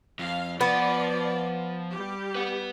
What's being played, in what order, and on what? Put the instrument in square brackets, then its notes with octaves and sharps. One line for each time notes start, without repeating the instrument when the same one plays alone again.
[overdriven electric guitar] F2 [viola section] F5
[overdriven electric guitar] F3 [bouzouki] B3 [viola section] D5
[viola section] G3 G4
[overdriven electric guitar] B4 F#5